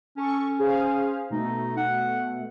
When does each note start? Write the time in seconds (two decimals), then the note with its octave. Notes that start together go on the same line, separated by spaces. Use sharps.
0.17 C#4 A4 C#6
0.59 G#4 C5 F5
1.30 B2 A3 D#4
1.77 F#5